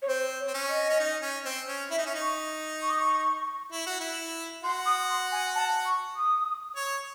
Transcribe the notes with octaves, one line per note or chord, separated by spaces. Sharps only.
C#5
C4 C5
C#5
C4
C#4
D#5
C#4
D#4
C#4
C4
C#4
E4 E5
D#4
C#4
D#4
C#6
C#6
D#6
C#6
E4
F#4
E4
F#4 C6
D#6
C6
G#5
A5
C#6
D#6
C#5